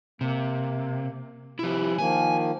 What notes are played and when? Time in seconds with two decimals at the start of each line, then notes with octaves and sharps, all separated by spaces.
0.21 C3 A#3
1.59 C3 F3 E4
1.98 D#3 F3 A#3 G#5